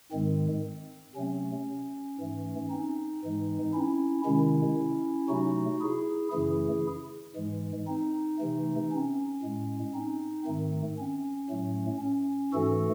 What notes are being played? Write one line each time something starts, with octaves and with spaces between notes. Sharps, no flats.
G#2 D#3 G#3 C4
C3 F#3 A3 C#4
G#2 E3 A3
C4 D#4
G#2 E3 G#3
C#4 E4
C3 D#3 G#3 C#4 E4
C3 F#3 A3 D#4 F#4
E4 G#4
F#2 C#3 E3 A3 E4 G#4
G#2 E3 G#3
C4 D#4
C3 E3 A3
C#4
A2 G#3
C4 D#4
G#2 D#3 A3 C4
C#4
A2 F#3 A3
C#4
G#2 E3 A3 F#4 A4